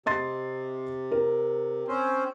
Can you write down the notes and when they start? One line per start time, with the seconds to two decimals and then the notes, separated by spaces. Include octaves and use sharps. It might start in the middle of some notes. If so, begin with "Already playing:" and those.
0.06 C3 D#5 C6 A6
1.11 A#4
1.88 C4 C#4 C5